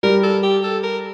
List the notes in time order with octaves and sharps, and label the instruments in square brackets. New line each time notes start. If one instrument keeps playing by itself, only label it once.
[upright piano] G3 [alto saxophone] A#4
[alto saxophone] A4
G4
A4
A#4